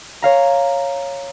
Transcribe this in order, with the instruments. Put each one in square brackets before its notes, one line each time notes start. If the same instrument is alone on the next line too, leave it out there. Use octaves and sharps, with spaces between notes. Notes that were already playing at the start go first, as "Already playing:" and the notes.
[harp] C#5 F5 A#5